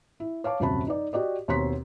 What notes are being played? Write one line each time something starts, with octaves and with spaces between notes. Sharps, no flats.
E4
C#5 F5 A5 D6
D#1 F#2 C3 F#4 A5 B5
D#4 D5
F#4 G4 D5 D#5
D#2 B2 C4 C#5 C6 B6